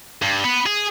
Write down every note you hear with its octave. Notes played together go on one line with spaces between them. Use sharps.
G2
B3
G#4